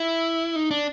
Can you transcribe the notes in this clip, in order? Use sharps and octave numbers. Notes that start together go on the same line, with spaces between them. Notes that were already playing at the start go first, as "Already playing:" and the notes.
Already playing: E4
D#4
D4